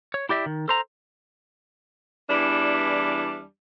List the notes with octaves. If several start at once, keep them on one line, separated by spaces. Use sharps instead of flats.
C#5
E4 G4 D5 E5
D#3
A4 C5 A#5
E2 E3 G3 D4 D5